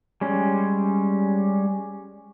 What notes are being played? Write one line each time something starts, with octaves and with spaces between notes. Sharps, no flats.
G3 G#3 C#4